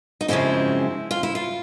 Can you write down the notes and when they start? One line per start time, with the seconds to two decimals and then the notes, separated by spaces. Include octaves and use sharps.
0.21 D#4
0.28 F#2 C#3 F3 G#3 C4 E4
1.11 F4
1.23 E4
1.35 F4